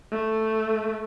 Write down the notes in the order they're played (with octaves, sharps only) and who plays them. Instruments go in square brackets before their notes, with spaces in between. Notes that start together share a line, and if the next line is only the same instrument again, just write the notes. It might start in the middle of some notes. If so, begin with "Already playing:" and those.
[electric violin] A3